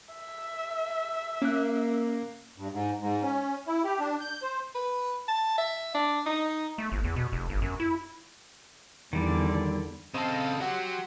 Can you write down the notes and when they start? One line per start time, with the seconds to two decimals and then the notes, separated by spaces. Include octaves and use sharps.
0.14 E5
1.42 A#3 C#4 F#6
2.58 G2
2.72 G#2
3.01 G#2
3.23 C#4
3.67 E4
3.84 G4
4.00 D4
4.20 G6
4.42 C5
4.75 B4
5.28 A5
5.58 E5
5.95 D4
6.26 D#4
6.78 A3
6.92 G1
7.04 E2
7.16 B2
7.32 F1
7.50 G1
7.62 F#2
7.80 E4
9.13 E2 D3 D#3 G3 D5
10.14 C#3 C4 A4 D#5 F5
10.60 F#3 G4 F#5 C6